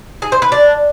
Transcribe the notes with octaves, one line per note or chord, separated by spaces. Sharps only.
G#4
C5
B4
D4